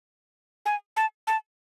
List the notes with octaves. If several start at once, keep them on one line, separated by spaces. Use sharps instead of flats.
G#5
A5
A5